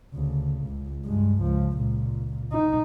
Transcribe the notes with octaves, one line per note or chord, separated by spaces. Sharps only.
D2 C#3
C#2
G2 G#3
C#2 F3
C#2 A#2
D#4